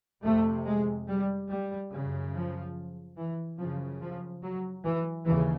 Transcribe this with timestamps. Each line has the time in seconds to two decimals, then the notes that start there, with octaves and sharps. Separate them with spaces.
0.24 F2 C3 A3
0.65 G#3
1.08 G3
1.49 G3
1.92 F#2 C#3
2.34 F3
3.16 E3
3.58 F#2 C#3 F3
4.00 F3
4.42 F#3
4.84 E3
5.25 D#2 C#3 E3